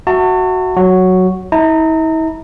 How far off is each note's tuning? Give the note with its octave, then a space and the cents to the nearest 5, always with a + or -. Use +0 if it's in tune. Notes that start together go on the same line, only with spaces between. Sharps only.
F#4 +0 E5 +0 A5 +40
F#3 +0 F#4 +0
E4 -45 A#5 -35